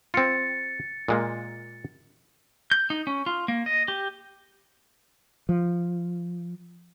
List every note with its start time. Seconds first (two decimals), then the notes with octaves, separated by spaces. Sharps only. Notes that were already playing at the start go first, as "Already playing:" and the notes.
0.14 C4 F4 A6 C#7
1.08 A#2 G#3 A#3
2.71 G6
2.90 D#4
3.07 C#4
3.26 F4
3.48 A#3
3.66 D#5
3.88 G4
5.49 F3